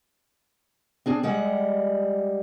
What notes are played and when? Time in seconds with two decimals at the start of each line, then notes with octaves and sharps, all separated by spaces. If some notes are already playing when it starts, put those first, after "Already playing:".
1.06 C4 D4 G#4
1.23 G3 G#3 F#5